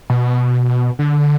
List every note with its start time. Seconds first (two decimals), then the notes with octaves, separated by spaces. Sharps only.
0.10 B2
0.99 D3